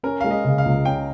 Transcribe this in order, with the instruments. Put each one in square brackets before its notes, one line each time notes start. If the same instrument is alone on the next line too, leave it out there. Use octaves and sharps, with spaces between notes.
[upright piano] C#4 [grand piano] A#4
[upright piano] G#3 [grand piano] F5
[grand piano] D#5
[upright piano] C#3
[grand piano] F5
[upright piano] C#2
[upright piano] C#4 [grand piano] G5